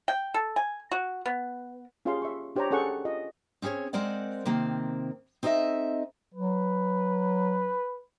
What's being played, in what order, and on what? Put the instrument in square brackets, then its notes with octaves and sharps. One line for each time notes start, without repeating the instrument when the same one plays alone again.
[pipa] G5
A4
G#5
F#4
B3
[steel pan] C#4 F4 G4 G#4 F5 C6
E5 C#6
D4 G4 C5 C#5 G5 A#5
C#4 G#4 A4 F#5 C#6
F4 D#5
[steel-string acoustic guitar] C4 C#4 G#4 A#4 C#5
G#3 C4 A#4 C5 D5 F#5
C3 D#3 A#3 C4
C4 D#4 A4 C#5 D#5 E5
[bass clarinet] F#3 [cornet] B4